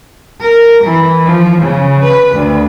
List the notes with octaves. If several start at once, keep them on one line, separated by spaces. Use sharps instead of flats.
A#4
E3
F3
C#3
B4
D2